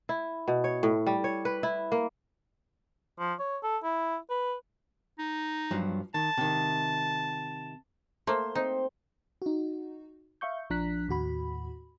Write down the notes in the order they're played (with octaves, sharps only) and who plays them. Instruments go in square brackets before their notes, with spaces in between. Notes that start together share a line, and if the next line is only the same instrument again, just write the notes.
[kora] E4
B2
C#5
A2
G3
C#5
B4
E4
A#3
[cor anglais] F3
C#5
A4
E4
B4
[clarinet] D#4
[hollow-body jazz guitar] G2 F3 F#3
[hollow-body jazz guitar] D#3 [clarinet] A5
[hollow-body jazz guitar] C3 D#3
[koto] A3 A#3 [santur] C5
[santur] C4 [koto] D#4
[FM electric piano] D#4 F#4
E5 F5 C#6 G6
A#1 F3 D4 A#5 F#6 B6
D#2 A2 F#4 B5